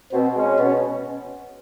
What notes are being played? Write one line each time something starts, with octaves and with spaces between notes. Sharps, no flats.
B2 C4
G#3 C#4
B2 C#4